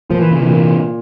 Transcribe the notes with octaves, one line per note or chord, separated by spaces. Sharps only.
A#2 F3
E3
C#3
C3 E3
A#2